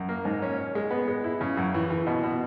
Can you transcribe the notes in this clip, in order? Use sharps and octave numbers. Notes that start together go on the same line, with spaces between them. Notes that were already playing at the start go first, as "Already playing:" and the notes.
Already playing: F#2
A#3
G#2
C#4
C#4
G#3
B3
G#3
E4
C#3
F#2
E3
E3
B2
B2